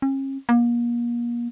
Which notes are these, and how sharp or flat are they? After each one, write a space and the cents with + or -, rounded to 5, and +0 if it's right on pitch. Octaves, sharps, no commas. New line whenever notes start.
C#4 -40
A#3 +35